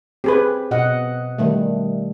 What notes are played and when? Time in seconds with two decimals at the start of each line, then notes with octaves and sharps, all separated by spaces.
0.24 C4 G4 G#4 B4
0.71 B2 D#5 F#5
1.39 D#3 G3 A3